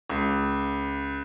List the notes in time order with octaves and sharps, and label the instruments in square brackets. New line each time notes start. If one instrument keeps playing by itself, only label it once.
[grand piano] C#2